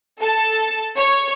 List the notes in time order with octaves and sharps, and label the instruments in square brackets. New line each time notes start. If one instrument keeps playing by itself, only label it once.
[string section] A4 A5
C#5